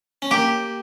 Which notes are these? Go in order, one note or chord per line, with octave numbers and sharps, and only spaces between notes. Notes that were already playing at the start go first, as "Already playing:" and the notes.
C#4
A#3 G4